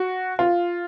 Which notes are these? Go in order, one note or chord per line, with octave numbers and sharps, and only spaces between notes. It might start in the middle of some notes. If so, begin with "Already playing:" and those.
Already playing: F#4
F4